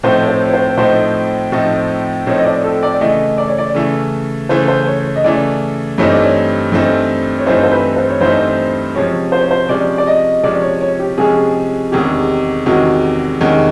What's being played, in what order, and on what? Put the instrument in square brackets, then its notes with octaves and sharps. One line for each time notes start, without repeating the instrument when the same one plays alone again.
[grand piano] A2 F3 A3 C4 D#4 [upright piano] C5
[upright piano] C#5
C5
C#5
C5
[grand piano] A2 F3 A3 C4 D#4 [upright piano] C5
[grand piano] A2 F3 A3 C4 D#4
[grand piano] A2 F3 A3 C4 D#4 [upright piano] C#5
[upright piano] D#5
D5
A4
D5
[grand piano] C#3 E3 A3 [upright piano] D#5
[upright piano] D5
C#5
D5
[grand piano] C#3 E3 A3
[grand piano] C#3 E3 A3 [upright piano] C5
[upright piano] C5
C#5
C#5
D#5
[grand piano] C#3 E3 A3 [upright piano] D5
[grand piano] G2 E3 A3 C4 D#4 [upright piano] C#5
[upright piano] D5
C#5
[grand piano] G2 E3 A3 C4 D#4
[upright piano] C#5
[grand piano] G2 E3 A3 C4 D#4 [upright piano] C5
[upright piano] C5
B4
C5
C#5
[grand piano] G2 E3 A3 C4 D#4 [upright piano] C5
[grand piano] C3 F3 G#3 C#4 [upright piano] C#5
[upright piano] C5
C#5
C5
[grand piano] C3 F3 G#3 C#4 [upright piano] D5
[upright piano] D5
D#5
[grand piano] C3 F3 G#3 C#4 [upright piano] D5
[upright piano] C#5
C#5
G4
[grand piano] C3 F3 G#3 C#4 [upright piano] G#4
[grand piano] E2 C3 D#3 G#3 C#4 [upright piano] G4
[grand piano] E2 C3 D#3 G#3 C#4 [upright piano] F#4
[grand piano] E2 C3 D#3 G#3 C#4